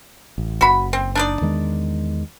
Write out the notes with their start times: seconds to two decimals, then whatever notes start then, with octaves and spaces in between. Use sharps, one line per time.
0.38 A1
0.61 F#1 F#4 B5
0.93 C4
1.15 D4 D#4 D5
1.41 E2 D#3 G#3